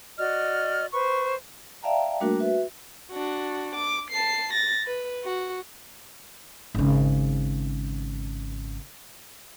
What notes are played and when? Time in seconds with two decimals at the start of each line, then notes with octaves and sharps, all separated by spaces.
0.18 F#4 D5 D#5 F6
0.93 B4 C5 C#6
1.83 D5 E5 F5 G5 A5 A#5
2.20 G3 A3 A#3 D4 F#4 A#4
2.40 F#4 B4 E5
3.11 D4 F#4
3.75 D6
4.10 A5 C7
4.53 A6 A#6
4.87 B4
5.24 F#4
6.75 G#1 C#3